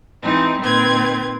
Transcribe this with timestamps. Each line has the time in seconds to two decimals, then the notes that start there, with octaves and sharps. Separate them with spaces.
0.23 E3 G#3 C4 D#4
0.62 A#2 D#3 C4 B4 G#6